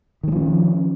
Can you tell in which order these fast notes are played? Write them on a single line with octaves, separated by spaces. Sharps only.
D#3 G#3 F3 C#4